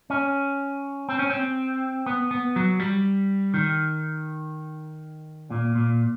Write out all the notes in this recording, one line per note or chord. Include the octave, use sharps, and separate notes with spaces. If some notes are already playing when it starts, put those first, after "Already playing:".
C#4
C4
C#4
C4
B3
B3
F#3
G3
D#3
A#2
A#2